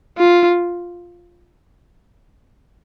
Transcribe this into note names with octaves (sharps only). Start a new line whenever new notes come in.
F4